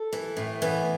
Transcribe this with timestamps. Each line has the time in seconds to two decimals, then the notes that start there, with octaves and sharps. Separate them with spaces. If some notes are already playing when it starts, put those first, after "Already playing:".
Already playing: A4
0.13 E3
0.37 A2
0.62 E3 B3